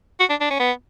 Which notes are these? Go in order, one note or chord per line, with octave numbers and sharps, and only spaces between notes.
F#4
D4
D4
C#4
B3